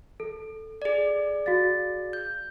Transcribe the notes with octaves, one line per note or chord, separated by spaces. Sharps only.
A4
G#4 D5
F#4 F5 A6
G6